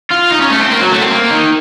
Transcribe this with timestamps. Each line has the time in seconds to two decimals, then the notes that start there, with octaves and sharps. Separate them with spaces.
0.11 F4
0.31 D#4
0.40 C#4
0.50 A3
0.60 C4
0.70 A#3
0.80 F#3
0.91 A3
1.01 C4
1.10 A#3
1.30 D#3